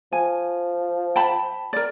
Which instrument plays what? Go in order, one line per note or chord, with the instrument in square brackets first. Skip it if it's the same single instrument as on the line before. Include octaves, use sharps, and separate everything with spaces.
[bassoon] F3 [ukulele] G#5
[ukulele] G5 A5 B5
A#4 D5